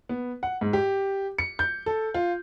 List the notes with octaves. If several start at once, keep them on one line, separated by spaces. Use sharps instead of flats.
B3
F#5
G#2
G4
C#7
G6
A4
F4